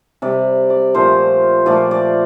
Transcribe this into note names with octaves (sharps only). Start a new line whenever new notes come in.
C3 G3 D5
D5
A#2 F3 A3 C5
A#2 F3 A3 D5
D5